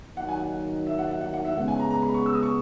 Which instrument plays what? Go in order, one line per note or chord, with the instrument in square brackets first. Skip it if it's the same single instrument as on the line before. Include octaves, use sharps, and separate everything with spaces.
[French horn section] D#3 F#3 A#3 D#4 [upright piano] F#5
[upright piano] G#5
F#5
E5
F#5
E5
F#5
F#5
E5
[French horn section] C#3 G#3 B3 [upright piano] F#5
[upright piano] G#5
A#5
A#5
B5
C#6
E6
D#6
C#6